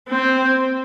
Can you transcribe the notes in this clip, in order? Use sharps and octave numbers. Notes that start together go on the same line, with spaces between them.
C4